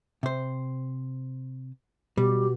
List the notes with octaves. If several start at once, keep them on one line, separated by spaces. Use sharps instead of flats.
C3 C5
B2 G3 G4